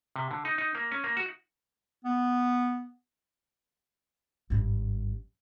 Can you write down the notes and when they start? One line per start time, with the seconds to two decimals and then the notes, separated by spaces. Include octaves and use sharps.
0.16 C3
0.31 D3
0.45 D#4
0.58 D#4
0.75 A#3
0.92 C#4
1.04 A#3
1.17 F#4
2.05 B3
4.50 G#1 G2